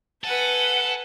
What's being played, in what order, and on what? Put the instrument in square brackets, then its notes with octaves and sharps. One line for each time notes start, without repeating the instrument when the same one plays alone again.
[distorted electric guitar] A4 [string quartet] B4 F#5 G#5